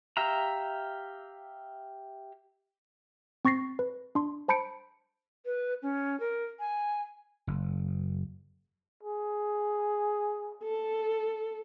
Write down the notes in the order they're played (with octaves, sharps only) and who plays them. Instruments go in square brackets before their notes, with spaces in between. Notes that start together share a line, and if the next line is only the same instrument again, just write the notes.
[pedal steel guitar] G4 E5 F5 A#5
[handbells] C4 C#6 A6 A#6 C7
B4
D4 C6
C5 A5 B5 G6 C#7 D7
[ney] B4
C#4
A#4
G#5
[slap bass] F#1
[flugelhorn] G#4
[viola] A4